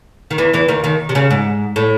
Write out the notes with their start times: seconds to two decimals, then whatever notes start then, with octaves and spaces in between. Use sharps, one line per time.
0.31 D#3
0.38 E2 E3
0.53 E2 E3
0.68 D#2 D#3
0.84 D#2 D#3
1.09 C3
1.15 C#3
1.31 G#2
1.76 A2